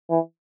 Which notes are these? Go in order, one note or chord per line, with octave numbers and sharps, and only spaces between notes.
E3